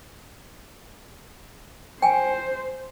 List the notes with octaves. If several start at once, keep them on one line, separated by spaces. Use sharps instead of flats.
C5 G5 G#5